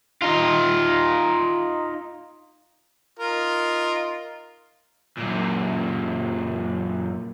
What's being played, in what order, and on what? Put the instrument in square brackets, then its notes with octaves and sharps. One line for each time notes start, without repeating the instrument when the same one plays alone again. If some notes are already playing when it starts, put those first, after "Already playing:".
[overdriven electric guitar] D#4 F4
[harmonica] D#4 F4 A#4
[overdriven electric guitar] F#2 A#2